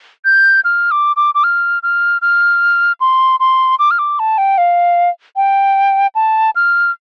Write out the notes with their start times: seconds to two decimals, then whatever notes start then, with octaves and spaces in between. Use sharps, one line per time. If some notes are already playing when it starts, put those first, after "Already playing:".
0.25 G6
0.64 F6
0.91 D6
1.16 D6
1.35 D6
1.44 F6
1.83 F6
2.22 F6
3.00 C6
3.40 C6
3.79 D6
3.91 F6
3.99 D6
4.19 A5
4.38 G5
4.58 F5
5.36 G5
6.15 A5
6.55 F6